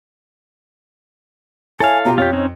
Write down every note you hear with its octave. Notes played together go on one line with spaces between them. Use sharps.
E4 A4 C#5 F5 G#5
B2 F4 G4 A#5
F2 F4 G4 C#5
C4 C#4 D#4